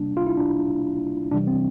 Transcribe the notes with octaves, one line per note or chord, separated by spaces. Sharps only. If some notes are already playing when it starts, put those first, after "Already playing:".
Already playing: C3 G3 A#3 D4
F4
E4
D4
C3 E3 G3 D4
C4